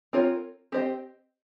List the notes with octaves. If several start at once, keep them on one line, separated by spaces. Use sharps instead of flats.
C4 F4 A#4 C#5
C4 G4 C5 D#5